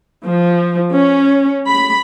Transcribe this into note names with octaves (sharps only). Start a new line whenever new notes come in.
F3
C#4
B5